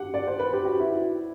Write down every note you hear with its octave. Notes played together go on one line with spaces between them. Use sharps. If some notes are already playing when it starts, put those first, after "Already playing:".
Already playing: G4 F#5
D5
C5
B4
G4
F#4
E4